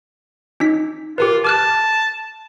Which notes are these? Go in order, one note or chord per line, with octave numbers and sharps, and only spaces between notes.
C#4 D#4 B6
F4 G4 A#4 B4
A5 D6 F6 F#6